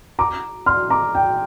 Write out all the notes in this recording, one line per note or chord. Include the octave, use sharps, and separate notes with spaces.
A#5 D6
C6 F6
A#5 D6
G5